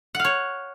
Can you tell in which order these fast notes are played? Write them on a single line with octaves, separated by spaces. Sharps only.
F#5 F5 C#5